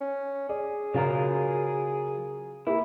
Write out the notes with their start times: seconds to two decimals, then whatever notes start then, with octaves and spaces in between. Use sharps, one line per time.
0.01 C#4
0.49 G#4 D5
0.94 C#3 F#3 F4 A#4
2.67 A#3 E4 G4